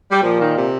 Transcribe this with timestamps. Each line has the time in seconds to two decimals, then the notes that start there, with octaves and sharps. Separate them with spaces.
0.11 G3
0.23 A#2 F3
0.40 D#3
0.57 C3